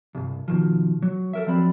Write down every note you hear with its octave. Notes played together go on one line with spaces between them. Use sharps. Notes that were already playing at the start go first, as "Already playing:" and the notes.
C2 G2
B2 D#3 F3
F#3
A4 A#4 E5
F3 F#3 C4 D5 B5